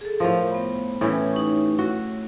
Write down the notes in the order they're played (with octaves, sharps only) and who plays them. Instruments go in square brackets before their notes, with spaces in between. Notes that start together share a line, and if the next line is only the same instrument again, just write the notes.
[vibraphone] G#4 A4
[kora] A2 F3 [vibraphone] A#4 F5
[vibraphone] B3 B5
[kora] A2 E3 C#4
[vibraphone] D#4 G4 C#6
[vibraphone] E4 [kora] F#4